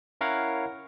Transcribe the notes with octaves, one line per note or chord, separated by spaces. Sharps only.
C#4 E4 A#4 C#5 F5 F#5